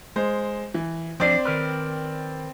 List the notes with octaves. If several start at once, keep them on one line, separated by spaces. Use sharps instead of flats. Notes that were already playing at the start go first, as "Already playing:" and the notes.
G#3 C5
E3
F3 C4 D4 D5
D#3 A#4 B4